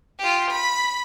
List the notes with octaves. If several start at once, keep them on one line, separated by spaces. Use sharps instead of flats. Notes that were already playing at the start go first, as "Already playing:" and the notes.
F4 G4
B5